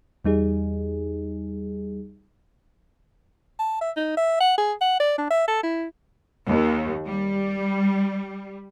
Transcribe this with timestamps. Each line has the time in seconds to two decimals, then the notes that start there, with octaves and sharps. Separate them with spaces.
0.25 E2 G3 D#4 G#4
3.59 A5
3.81 E5
3.97 D#4
4.17 E5
4.41 F#5
4.58 G#4
4.81 F#5
5.00 D5
5.18 D4
5.31 E5
5.48 A4
5.63 E4
6.49 D#2
7.06 G3